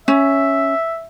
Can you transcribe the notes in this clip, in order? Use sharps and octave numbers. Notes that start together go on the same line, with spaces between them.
C#4 E5